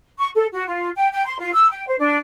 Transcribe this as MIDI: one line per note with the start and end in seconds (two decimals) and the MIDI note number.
0.18 0.28 85
0.34 0.45 69
0.52 0.63 66
0.67 0.89 65
0.95 1.08 79
1.12 1.23 79
1.25 1.39 84
1.39 1.50 65
1.53 1.67 88
1.69 1.85 79
1.87 1.95 72
1.98 2.17 62